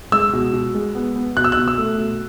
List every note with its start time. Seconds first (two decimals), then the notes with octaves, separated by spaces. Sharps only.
0.12 G#3 E6
0.33 B2
0.53 B2
0.75 G#3
0.95 B3
1.16 B3
1.37 B2 F#6
1.44 E6
1.52 F#6
1.57 B2
1.68 E6
1.78 A3
1.98 B2